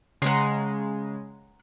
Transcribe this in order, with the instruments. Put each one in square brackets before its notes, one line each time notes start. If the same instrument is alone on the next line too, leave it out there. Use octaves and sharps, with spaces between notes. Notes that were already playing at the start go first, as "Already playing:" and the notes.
[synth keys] C#3 G#3 [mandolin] F#5 A#5 C6